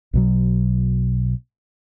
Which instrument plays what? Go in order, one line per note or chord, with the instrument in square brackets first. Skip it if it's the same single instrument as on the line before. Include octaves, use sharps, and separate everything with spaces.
[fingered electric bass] B1 B2 F#3